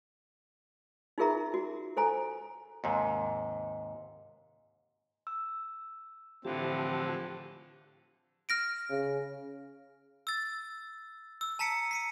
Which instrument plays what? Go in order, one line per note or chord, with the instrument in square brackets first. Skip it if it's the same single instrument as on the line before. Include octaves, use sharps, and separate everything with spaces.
[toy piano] D#4 F4 G#4 A#4 E5 A#5
F#4
A4 C5 G#5 A#5
[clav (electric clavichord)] D#2 G#2 C3
[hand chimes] E6
[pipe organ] A2 D3 E3 [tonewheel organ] F3 G4 A5 [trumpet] C4
[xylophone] F6 A#6 D7
[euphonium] C#3
[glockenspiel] E6 A6
E6
A5 A#5 B6 C#7 D7
C7 C#7 D#7